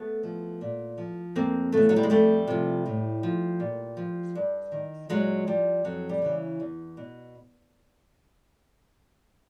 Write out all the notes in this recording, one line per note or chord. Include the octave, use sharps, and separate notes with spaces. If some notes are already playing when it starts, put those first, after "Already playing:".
Already playing: A3 B3
F3
A#2
F3
F2 A#3 C4
C#3 E3 A3 B3
F#3
G3
G#3
F2 G3 A3
C3 F3
A2
F3
A#2
F3
G2
D#3
A#2 F#3 G#3
F3 G3
F2 F#3
G3
C#3 E3
E2
B2